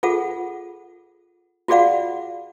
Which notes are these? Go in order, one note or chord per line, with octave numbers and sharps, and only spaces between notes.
F4 G#4 A4 F#5
F4 F#4 G#4 D5 F5 F#5